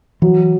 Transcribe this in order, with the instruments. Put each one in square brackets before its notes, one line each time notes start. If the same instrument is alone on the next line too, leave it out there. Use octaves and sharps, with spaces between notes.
[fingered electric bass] E3 [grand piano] F#3